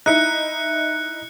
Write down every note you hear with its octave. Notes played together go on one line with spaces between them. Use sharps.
D#4 E4 F#6 C#7